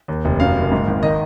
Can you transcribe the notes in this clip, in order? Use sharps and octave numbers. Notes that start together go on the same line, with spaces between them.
D#2
F1
F#2 F5
F#1
G#2
G#1
D#3 D#5